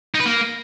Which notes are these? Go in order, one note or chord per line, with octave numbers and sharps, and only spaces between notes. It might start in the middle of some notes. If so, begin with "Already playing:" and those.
D#4
B4
A#3